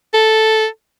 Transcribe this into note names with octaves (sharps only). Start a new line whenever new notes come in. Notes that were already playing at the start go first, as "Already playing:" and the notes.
A4